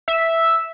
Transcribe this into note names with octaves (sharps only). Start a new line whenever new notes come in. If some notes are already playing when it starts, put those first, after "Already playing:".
E5